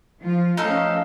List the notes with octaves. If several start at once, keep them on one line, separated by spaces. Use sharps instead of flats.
F3 F4
F3 A3 C#4 D#4 A4 F5